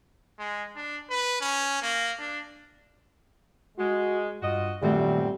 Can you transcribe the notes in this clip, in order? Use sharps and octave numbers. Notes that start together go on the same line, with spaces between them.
G#3
D4
B4
C#4
A#3
D4
G#3 F#4
G2 F4 F#4 D#5
F#2 A#2 D#3 F#3 G3 A3 C4